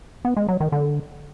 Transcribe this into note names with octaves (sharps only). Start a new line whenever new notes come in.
B3
G#3
F#3
D#3
D3